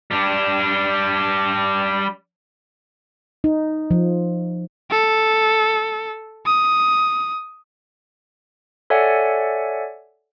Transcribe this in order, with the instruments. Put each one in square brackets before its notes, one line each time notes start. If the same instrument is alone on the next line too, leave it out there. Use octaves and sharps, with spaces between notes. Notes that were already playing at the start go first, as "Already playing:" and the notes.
[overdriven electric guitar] G3 D4
[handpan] D#4
F3
[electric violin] A4
D#6
[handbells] A4 C#5 D5 E5 F#5 G#5